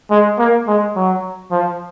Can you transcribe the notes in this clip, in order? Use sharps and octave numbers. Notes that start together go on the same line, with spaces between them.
G#3
A#3
G#3
F#3
F3